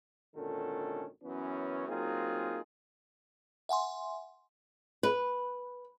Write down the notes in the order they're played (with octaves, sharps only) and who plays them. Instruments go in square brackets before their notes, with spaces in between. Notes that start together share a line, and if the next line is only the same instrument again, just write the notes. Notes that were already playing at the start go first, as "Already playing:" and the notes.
[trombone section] G#1 A#2 D3 D#3 C#4 A4
F#2 E3 B3 C#4
F#3 A#3 C4 D#4 F4 G#4
[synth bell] E5 F#5 G#5 C6
[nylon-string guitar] B4